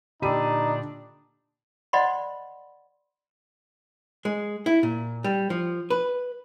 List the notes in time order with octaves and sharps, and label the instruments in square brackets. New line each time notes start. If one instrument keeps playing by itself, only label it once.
[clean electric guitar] A#2 D3 [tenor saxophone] D4 [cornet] D#4 [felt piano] G4 B5 D#7
[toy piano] C5 D5 D#5 F#5 B5 C6
[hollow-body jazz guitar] G#3
E4
A#2
G3
F3
B4